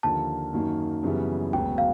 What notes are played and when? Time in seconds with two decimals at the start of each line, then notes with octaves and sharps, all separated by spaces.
0.03 D#2 D3 F3 A#3 A5
0.53 F#2 D#3 F#3 A#3 D#4
1.03 F#2 C#3 E3 G3 B3
1.53 E1 D2 C#3 F#3 B3 G5
1.78 F5